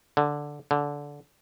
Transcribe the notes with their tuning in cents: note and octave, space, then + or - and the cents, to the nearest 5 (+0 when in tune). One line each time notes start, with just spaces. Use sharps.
D3 +0
D3 -15